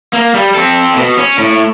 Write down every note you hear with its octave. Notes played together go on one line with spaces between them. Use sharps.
A#3
G3
C4 A4
B2
C#4
A2